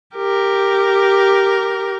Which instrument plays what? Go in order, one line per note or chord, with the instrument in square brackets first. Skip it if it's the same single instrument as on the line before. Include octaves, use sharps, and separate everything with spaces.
[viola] G4 A#4